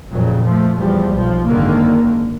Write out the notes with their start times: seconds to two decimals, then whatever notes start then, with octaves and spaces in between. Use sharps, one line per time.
0.12 F2 A#2 C#3 F#3
0.45 F3 A3
0.77 E2 F3 G3
1.14 B1 F3
1.47 G#1 F#2 D3 D#3 A#3